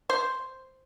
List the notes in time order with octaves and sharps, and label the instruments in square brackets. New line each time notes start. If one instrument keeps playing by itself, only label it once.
[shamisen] C5